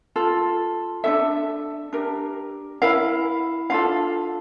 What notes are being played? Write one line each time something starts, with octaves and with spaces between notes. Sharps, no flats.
F4 A4
D4 F4 A4 E5
D4 G4 A#4
E4 A#4 F5
D4 F4 A4 F5